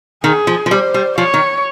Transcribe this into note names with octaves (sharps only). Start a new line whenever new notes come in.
D#3 G#4
F3
F3
G3 C5
G3
F3 C#5
D#3